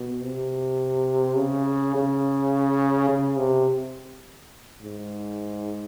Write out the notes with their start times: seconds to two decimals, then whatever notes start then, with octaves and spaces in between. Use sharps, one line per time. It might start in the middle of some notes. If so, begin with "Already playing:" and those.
Already playing: B2
0.23 C3
1.37 C#3
1.95 C#3
3.09 C#3
3.38 C3
4.82 G#2